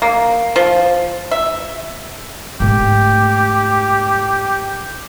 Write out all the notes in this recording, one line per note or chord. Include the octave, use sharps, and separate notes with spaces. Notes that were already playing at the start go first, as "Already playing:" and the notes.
A#3
F3
E5
G#2 A3 G4